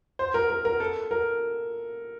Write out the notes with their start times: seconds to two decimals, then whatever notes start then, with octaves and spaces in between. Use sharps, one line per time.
0.19 C5
0.34 A#4
0.50 A#4
0.65 A#4
0.80 A4
1.11 A#4